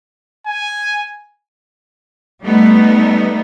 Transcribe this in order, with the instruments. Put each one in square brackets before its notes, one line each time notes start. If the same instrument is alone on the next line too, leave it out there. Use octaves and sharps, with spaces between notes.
[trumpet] G#5
[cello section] G3 A3 B3 D#4